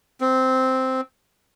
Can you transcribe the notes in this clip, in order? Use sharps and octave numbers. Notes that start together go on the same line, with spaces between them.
C4